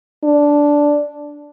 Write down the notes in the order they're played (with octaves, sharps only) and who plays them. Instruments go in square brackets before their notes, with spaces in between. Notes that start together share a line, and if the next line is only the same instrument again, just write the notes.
[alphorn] D4